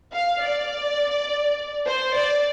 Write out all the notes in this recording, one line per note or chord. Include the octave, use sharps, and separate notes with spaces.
F5
D5
C5
D5